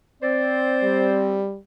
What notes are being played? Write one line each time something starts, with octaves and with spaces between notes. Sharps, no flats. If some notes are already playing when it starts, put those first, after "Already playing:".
C4 C5 D5
G3